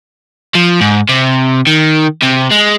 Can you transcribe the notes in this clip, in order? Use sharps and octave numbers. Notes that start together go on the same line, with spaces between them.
F3
G#2
C3
D#3
C3
G#3